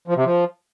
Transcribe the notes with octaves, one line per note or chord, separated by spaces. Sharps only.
F3
C3
F3